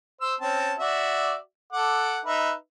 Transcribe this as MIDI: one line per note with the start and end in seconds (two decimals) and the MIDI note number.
0.21 0.34 72
0.21 0.34 88
0.41 0.74 60
0.41 0.74 61
0.41 0.74 81
0.79 1.36 66
0.79 1.36 74
0.79 1.36 76
1.73 2.20 69
1.73 2.20 78
1.73 2.20 86
2.25 2.52 63
2.25 2.52 71
2.25 2.52 76